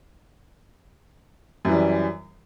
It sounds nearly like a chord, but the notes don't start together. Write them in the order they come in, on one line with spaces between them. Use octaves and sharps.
F#2 E3 G3